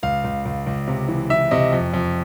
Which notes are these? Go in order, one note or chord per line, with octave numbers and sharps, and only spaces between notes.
C#2 F5
C#2
C#2
C#2
C3
E3
E3 E5
C3 D#5
F2
F2